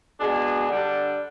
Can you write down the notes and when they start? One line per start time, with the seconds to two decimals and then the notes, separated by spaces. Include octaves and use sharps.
0.20 B2 G#3 D4 G#4
0.69 D3 G3 D4